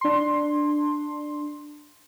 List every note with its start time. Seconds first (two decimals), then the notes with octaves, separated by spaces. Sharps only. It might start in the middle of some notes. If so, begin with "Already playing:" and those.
0.01 D4 C6